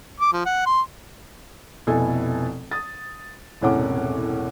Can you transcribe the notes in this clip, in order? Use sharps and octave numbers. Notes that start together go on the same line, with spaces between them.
D6
F3
F#5
C6
F1 B2 E4 A4 G#5
D#6 A6
E1 C2 A2 C#4 F#5 D6